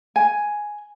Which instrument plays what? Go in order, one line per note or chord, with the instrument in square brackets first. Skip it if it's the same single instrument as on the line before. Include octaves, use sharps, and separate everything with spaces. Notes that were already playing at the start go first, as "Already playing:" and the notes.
[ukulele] G#5